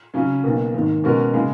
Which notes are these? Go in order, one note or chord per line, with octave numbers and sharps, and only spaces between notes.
C#3 F#3 C#4
B1 B2 A#3
G#1 G#2 D#3
B2 G#3 C#4 F#4 A#4
C#3 G#3